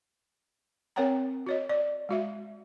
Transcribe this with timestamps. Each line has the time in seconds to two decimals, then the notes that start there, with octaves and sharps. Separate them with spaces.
0.96 C4 A#4 C#5 F#5 G5 A#5
1.47 F#4 C#5 D#5
1.69 D5
2.09 G#3 F#4 E5